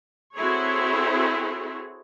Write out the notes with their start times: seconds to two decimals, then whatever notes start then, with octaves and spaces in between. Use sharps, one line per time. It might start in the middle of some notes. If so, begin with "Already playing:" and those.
0.36 C4 E4 F#4 G#4 A4 C#5